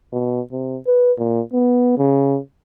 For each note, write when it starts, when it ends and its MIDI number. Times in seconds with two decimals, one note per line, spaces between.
0.13 0.41 47
0.52 0.78 48
0.87 1.12 71
1.18 1.41 46
1.53 1.95 59
1.98 2.39 49